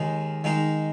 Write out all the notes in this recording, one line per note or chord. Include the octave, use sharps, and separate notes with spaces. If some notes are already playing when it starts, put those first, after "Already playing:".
Already playing: D#2 D#3 G#3 D#4 G#4
D#3 G#3 D#4